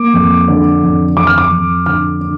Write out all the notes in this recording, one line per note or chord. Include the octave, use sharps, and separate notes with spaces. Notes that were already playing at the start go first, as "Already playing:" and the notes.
Already playing: A#3 D6
F2
D3
F2
F2 D6
F6
D6
F2
D3 F6
D3